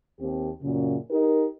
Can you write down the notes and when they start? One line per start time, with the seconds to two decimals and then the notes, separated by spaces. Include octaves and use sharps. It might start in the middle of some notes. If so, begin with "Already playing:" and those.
0.19 D#2 C4 G4
0.62 F#2 A#2 C#3
1.10 D#4 G4 A#4